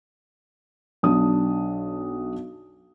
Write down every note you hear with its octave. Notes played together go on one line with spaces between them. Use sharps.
B1 D4 D#6